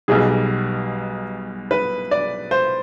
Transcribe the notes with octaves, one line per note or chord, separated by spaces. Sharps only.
B1 B2 G3 G#4
B4
D5
C5